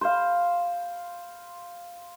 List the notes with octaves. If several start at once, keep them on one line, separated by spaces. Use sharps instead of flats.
C5 F5